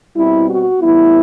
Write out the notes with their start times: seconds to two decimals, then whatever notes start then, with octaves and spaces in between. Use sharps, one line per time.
0.16 B2 G3 C4 E4
0.48 F#4
0.79 A2 E3 G3 B3 E4